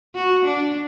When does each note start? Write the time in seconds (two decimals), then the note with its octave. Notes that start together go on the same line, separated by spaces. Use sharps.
0.15 F#4
0.45 D4